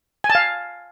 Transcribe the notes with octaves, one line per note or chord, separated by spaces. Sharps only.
G#5
A5
F5